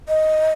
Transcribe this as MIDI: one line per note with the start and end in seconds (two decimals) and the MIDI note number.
0.08 0.51 75